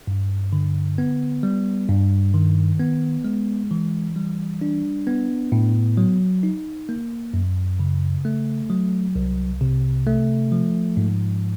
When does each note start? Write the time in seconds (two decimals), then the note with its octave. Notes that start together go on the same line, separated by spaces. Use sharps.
0.07 G2
0.53 D3
0.98 B3
1.43 G3
1.89 G2
2.34 D#3
2.80 B3
3.24 G#3
3.71 E3
4.16 G3
4.61 D4
5.07 B3
5.52 A2
5.97 F#3
6.43 D#4
6.89 A#3
7.34 F#2
7.79 C#3
8.25 A3
8.70 F#3
9.15 C2
9.61 C3
10.07 A3
10.52 F3
10.97 G#2